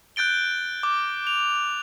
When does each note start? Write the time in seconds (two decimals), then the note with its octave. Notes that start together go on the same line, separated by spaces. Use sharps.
0.16 F#6 G6 A6 D7 G7
0.83 D6
1.27 F7